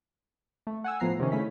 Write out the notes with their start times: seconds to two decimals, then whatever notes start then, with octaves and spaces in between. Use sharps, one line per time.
0.67 A3
0.84 F#5 G#5 E6
1.00 A2 F3 B3 A#5 C7
1.19 C3 D#3 C#4
1.32 C#3 A3 C#4 E4 B6